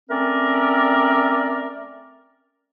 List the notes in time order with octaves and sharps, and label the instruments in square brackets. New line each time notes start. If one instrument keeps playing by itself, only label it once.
[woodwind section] A3 C4 C#4 A#4 D5